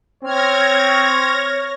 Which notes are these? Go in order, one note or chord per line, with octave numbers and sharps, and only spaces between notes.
C4 C#5 F6 G#6 A#6